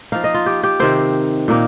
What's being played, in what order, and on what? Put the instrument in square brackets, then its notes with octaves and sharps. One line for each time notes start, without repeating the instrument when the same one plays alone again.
[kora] F3 A#3 D#4 F5
D#5
F4
G4
G4
C3 D#3 C4 C5
A#2 A#3 D#4